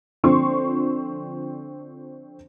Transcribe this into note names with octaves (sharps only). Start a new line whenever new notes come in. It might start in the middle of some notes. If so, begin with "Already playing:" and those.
D3 F3 C4 C6 C#6